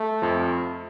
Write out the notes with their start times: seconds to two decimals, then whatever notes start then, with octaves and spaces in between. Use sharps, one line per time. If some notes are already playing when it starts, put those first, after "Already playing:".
Already playing: A3
0.22 F2 F3